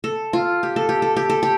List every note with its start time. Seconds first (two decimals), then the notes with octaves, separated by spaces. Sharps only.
0.04 A4
0.33 F4
0.63 G4
0.76 A4
0.89 G4
1.02 A4
1.16 G4
1.30 A4
1.43 G4